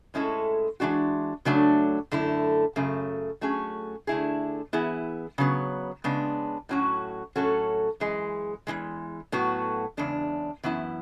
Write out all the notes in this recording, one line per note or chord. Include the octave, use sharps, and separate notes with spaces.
A2 G#3 C#4 E4 A4
E3 G#3 D4 F#4
C#3 F#3 A3 D4
F#2 D3 A3 E4
F#2 C#3 F#3 A3
F#3 A3 C#4 G#4
D3 A3 E4 G#4
E3 B3 E4 G#4
C#3 F#3 B3
C#3 G#3 B3 D4
A2 F#3 C#4 F#4
A2 F#3 C#4 F#4 A4
F#2 E3 G#3 G#4
E2 C#3 E3 G#3
A2 F#3 B3 F#4
E2 C#3 G#3 D4
F#2 E3 B3 E4